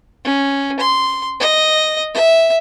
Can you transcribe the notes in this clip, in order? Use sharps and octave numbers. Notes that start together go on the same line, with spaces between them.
C#4
C6
D#5
E5